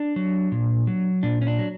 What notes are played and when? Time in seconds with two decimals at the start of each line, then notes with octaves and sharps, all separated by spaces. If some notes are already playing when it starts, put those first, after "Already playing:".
Already playing: D4
0.16 F#3
0.52 A#2
0.87 F#3
1.23 A#2 D4
1.42 C#4
1.47 D4
1.59 F#3